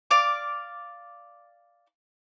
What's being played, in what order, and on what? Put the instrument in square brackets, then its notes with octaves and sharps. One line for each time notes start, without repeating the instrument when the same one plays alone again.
[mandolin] D5 F5 D6